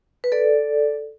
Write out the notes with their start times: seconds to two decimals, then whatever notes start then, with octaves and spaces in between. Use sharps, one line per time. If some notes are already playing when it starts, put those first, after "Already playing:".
0.24 B4
0.32 A4 D5